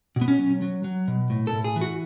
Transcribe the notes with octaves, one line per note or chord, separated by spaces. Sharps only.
B2
B3
C#4
F#3
F#3
F#3
B2
A2
A4
A2
G#4
E3
F#4